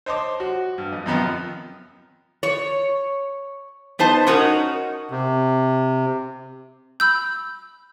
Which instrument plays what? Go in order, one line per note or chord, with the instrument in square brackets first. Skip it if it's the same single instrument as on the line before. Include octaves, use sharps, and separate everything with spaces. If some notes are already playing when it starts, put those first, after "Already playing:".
[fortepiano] C5 C#5 D#5 A5 C6 D6
F#4
G2
F2
F#2 C3 D#3 F3 B3 D#4
[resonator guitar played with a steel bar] C#5
B3 D#4 C5 A5
C#4 D#4 F#4 A#4
[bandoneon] C3
[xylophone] B5 E6 G6